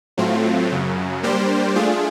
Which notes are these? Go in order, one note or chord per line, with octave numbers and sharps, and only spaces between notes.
A2 F#3 A3 C4 F4
F#2 C#3 F#3
G3 A#3 D4 G4 C5
A3 D4 F4 G#4